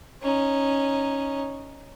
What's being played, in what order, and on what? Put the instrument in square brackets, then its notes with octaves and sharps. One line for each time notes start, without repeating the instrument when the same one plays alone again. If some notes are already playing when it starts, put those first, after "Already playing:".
[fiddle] C#4 D#4